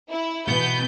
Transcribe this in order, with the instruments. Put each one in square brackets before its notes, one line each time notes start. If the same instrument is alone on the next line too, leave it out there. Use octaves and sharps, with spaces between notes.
[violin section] E4
[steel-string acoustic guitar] B2 E3 [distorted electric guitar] B3 [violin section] G6